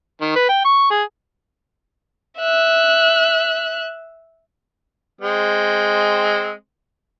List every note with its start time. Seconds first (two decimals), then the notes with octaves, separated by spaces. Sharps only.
0.21 D#3
0.35 B4
0.49 G5
0.65 C#6
0.91 G#4
2.40 E5 F#6
5.21 G#3 C4